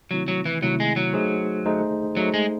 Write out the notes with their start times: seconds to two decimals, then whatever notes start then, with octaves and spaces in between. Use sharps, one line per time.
0.11 C3 D#3 F#3 A3 C4 E4
0.28 F#3
0.46 E3
0.62 C3 D#3 F#3 A3 C4 E4
0.80 G#3
0.96 F#3
1.13 A3 D#4 G#4 C5
1.66 A3 D#4 G#4 C5
2.17 F#3 A3 D#4 G#4 C5
2.34 G#3